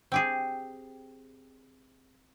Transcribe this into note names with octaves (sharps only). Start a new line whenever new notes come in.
C4 G4 G#4